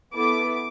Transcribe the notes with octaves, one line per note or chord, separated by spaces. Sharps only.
B3 E4 A4 D6